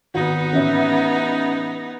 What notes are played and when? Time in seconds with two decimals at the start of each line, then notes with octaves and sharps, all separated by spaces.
0.14 G#1 B3 D#4 F#4
0.53 A1 C#4 E5